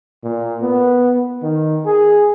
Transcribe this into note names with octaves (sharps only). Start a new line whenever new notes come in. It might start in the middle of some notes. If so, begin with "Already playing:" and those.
A#2
B3
D#3
G#4